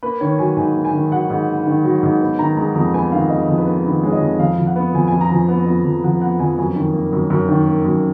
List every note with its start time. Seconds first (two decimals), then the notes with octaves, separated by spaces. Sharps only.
0.03 A#3 B4
0.20 D#3 C#5
0.39 F#3 G#5
0.57 G#2 G#5
0.75 A#3
0.85 G#5
0.93 D#3
1.11 F#3 F#5
1.30 G#2
1.48 A#3
1.67 D#3
1.84 F#3
2.03 G#2
2.21 B3
2.39 D#3 A#5
2.57 G#3 A#5
2.75 F2 A#5
2.94 B3 G#5
3.12 D#3 F5
3.30 G#3 D#5
3.48 F2
3.57 B4
3.67 B3
3.85 D#3 B4
4.03 G#3 C#5
4.12 D#5
4.21 F2
4.39 F2 F5
4.58 F3
4.67 F#5
4.76 B3
4.94 F2 G#5
5.08 G#5
5.12 F2
5.21 A#5
5.31 F3 G#5
5.49 B3
5.66 F2
5.84 F2
6.04 F3 F#5
6.21 B3 F#5
6.39 F2 G#5
6.58 F#2 G#5
6.76 D#3
6.94 A#3
7.12 F#2
7.30 F#2
7.48 D#3
7.67 A#3
7.85 F#2